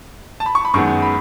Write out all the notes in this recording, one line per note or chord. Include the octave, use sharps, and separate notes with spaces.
A5
B5
C#6
B5
F#2 D#3 G#3 B3 C#6
B5